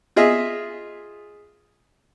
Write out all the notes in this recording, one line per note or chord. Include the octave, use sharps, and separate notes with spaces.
F4 G#4 D#5 E5